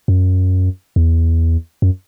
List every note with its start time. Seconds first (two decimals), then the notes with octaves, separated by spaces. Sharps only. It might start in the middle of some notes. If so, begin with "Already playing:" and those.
0.08 F#2
0.96 E2
1.82 F#2